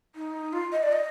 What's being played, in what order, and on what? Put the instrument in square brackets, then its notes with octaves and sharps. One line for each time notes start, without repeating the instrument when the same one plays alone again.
[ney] D#4
F4
D#5
D5
D#5